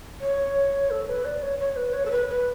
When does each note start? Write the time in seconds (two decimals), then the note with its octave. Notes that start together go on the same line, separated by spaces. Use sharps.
0.21 C#5
0.91 A4
1.08 B4
1.25 D5
1.42 C#5
1.59 C#5
1.76 B4
1.93 C#5
2.06 A4
2.11 B4
2.29 B4